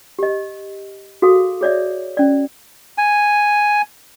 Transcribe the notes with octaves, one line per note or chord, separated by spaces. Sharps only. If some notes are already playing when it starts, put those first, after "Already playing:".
G4 D#5
F#4 G#4 A4 F5 D#6
G#4 C#5 D5 E5
C#4 D5
G#5